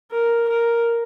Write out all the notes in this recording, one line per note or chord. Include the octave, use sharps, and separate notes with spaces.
A#4
A#4